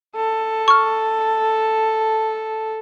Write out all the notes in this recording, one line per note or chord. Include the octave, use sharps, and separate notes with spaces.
A4
C#6 F6